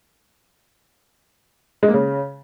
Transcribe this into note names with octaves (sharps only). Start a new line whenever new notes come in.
G#3
A#3
C#3